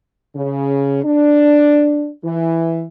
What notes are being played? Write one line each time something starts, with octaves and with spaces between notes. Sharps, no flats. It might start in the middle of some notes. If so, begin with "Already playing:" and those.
C#3
D4
E3